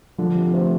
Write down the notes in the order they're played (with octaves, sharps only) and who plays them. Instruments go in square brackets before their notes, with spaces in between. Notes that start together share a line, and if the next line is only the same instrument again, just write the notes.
[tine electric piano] D3 [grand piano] F3
[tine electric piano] C3
[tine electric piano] A3 [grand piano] C5